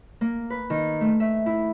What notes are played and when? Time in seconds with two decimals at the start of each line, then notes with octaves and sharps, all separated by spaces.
0.21 A#3
0.50 B4
0.70 D#3
1.01 A3
1.20 E5
1.46 E4